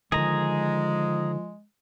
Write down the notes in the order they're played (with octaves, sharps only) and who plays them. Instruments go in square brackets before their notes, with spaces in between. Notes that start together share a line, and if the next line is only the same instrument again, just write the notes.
[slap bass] D3 D#3 [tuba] F3 [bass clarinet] G#3 [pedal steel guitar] G#4 A#5